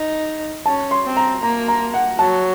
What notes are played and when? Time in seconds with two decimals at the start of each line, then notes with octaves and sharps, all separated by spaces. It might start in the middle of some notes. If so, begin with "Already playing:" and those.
Already playing: D#4
0.66 C#4 A5
0.91 C6
1.05 C4
1.17 A#5
1.42 A#3 A#5
1.68 A#5
1.94 F#5
2.19 F#3 A5